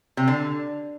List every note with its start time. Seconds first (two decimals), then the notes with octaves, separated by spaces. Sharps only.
0.17 C3
0.28 D3